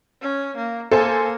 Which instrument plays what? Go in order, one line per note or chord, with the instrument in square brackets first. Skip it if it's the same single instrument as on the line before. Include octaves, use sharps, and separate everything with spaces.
[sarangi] C#4
A#3
[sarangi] A#3 [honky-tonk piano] A4 C5 G#5